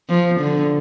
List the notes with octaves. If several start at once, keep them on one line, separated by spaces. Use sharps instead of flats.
F3
D3